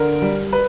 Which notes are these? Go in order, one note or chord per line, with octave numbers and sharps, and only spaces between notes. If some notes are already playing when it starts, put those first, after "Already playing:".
Already playing: D3 A#4
G3
B4